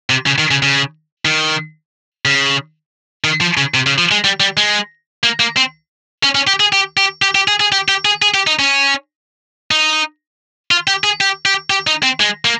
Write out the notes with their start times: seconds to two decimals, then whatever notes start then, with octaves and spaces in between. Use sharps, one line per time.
0.10 C3
0.26 C#3
0.38 D#3
0.51 C#3
0.62 C#3
1.25 D#3
2.25 C#3
3.24 D#3
3.41 F3
3.57 C#3
3.74 C3
3.86 C#3
3.98 F3
4.11 G#3
4.24 G3
4.40 G3
4.57 G#3
5.23 A#3
5.40 A#3
5.57 C4
6.23 C#4
6.35 C#4
6.47 G4
6.60 G#4
6.73 G4
6.97 G4
7.22 G4
7.35 G4
7.48 G#4
7.60 G#4
7.72 G4
7.88 G4
8.05 G#4
8.22 G#4
8.34 G4
8.47 D#4
8.59 C#4
9.71 D#4
10.71 F4
10.87 G4
11.04 G#4
11.21 G4
11.45 G4
11.70 G4
11.87 D#4
12.03 C4
12.20 G#3
12.45 A#3